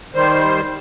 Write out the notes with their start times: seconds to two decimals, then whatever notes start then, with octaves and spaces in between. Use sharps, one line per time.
0.14 D#3 G3 C5